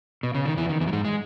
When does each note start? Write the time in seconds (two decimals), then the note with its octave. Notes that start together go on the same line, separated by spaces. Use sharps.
0.23 B2
0.35 C#3
0.46 D#3
0.57 E2 E3
0.69 D#3
0.81 E2 E3
0.88 F#3
0.93 G#2 G#3
1.05 G#3